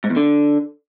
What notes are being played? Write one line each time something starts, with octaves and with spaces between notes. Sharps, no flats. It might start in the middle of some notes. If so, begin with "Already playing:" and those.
G#2
E2
D3